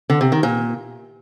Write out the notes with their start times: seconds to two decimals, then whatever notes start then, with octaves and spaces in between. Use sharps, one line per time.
0.10 D3
0.21 C3
0.32 D#3
0.43 A#2